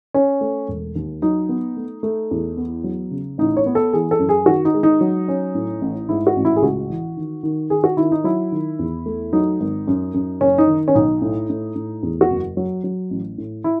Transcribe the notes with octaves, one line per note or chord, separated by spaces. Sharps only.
C#4
A3
E1
D#2
F#3 D#4
B3
A3
A3
E2
B3
F#3
C#3
A1 D#4
C#5
B3
A4
E3 G#4
A4
F#2
G#4
D#3 F#4
D#4
G#3
D#4
F#3
C#4
A2
A1
G#2 E4
F#4
A1
E4
G#4
C#2 F#4
E3
D#3
D#3
D#3 G#4
F#4
D#3 E4
D#4
F#3 E4
D#3
E2
A3
F#3 D#4
G#1
F#2
F#2
F#1 C#4
D#4
D#3
C#4
B1 D#4
A2
A2
A2
E2
F#4
F#1
F#3
F#3
A1
A2
E4